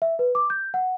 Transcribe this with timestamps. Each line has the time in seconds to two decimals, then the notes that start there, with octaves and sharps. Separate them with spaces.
0.02 E5
0.19 B4
0.35 D6
0.50 G6
0.74 F#5